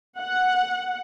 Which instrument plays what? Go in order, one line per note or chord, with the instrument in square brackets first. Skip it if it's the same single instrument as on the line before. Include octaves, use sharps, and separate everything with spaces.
[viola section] F#5